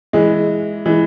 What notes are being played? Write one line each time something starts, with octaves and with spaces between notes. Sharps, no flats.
E3 G#3
E3 G#3